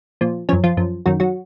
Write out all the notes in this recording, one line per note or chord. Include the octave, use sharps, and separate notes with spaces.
A#2 F3
F#2 F3 C#4 C#5
F3 F4
F#2 F3
F#2 D#3 F#3 F#4
F#3 F#4